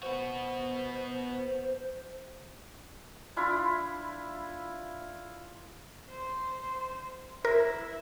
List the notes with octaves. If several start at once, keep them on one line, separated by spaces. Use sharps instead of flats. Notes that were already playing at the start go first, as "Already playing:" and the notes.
B3 F#4 C5
D4 E4 F4 B5
C5
E4 A#4